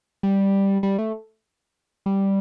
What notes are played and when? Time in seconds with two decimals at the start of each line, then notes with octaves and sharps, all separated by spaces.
0.23 G3
0.83 G3
0.99 A3
2.06 G3